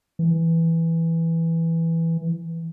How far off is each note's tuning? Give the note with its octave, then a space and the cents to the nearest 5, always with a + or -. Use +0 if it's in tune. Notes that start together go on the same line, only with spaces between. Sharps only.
E3 +0